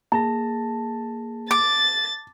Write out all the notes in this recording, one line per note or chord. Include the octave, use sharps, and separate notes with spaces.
A#3 G#4 A5 A#6
D6 A6